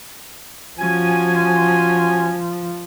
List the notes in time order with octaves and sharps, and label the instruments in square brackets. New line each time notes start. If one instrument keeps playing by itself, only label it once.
[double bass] F3 [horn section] C#4 F#4 G#5